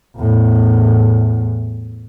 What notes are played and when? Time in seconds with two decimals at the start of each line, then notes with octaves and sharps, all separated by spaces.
0.17 E2 A2